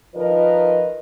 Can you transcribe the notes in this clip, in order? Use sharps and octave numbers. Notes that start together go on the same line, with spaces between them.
D#3 F3 A#4 B4 D#5